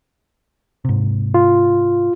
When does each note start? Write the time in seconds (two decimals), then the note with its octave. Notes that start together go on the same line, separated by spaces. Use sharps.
0.85 G#2 C3
1.34 F4